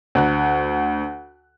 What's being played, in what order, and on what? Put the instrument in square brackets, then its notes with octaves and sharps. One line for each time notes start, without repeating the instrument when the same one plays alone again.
[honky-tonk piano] D2 F#6